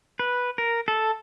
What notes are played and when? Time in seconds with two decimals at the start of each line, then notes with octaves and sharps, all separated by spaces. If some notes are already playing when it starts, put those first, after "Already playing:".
0.19 B4
0.58 A#4
0.88 A4